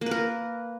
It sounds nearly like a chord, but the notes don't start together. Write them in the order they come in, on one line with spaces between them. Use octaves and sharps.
A#3 B4 A#4